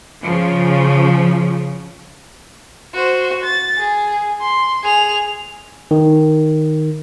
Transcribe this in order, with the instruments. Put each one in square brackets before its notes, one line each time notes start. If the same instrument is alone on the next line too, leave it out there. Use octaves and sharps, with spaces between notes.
[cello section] C#3 F3
[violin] F#4 C5
A6
G#4
C6
G#4 F7
[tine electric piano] D#3